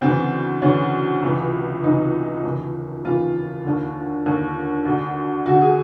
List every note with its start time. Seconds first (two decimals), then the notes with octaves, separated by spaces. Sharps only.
0.01 D2 C#3 E3 C4
0.62 D2 C#3 E3 C#4
1.22 C#2 C3 E3
1.83 C#2 C3 E3 D#4
2.43 D#2 C#3 E3
3.05 D#2 C#3 E3 F4
3.64 D#2 D3
4.26 D#2 D3
4.85 D2 D3
5.46 D2 D3 F#4
5.61 G#4